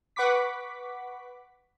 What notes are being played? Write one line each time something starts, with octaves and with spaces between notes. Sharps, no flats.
B4 F#5 B5 C#6 D6 B6